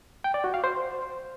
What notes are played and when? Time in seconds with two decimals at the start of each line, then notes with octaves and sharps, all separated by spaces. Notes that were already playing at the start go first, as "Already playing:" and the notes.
0.24 G5
0.34 D5
0.44 F#4
0.54 F5
0.64 C5